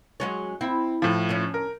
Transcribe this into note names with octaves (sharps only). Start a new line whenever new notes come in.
F#3 G#3 C#4
C4 E4
A2 F3
C#4 D4
A#4